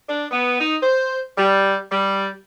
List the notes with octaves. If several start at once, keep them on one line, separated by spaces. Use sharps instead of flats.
D4
B3
D#4
C5
G3
G3